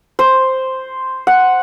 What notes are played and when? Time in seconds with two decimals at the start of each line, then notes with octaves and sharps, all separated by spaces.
0.19 C5
1.27 F#5